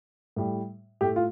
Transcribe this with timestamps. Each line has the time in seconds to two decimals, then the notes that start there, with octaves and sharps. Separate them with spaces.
0.36 A2 G3
1.01 A2 A3 G4
1.16 F4